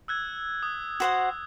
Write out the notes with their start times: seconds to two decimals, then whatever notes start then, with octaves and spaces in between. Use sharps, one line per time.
0.08 E6 F#6 G#6
0.63 D#6
1.00 F#4 C5 F#5